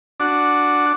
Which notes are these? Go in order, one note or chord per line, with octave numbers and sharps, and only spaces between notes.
D4 F#4